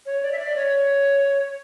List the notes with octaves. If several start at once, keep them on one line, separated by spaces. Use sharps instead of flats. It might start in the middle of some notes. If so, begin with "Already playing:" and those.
C#5
D5
E5
D5
C#5